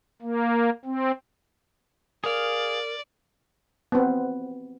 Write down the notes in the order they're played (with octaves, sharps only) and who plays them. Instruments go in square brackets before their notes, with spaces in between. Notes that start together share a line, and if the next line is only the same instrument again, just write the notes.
[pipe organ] A#3
C4
[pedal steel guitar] G#4 F5 [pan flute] A#4 [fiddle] D5
[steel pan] B3 C4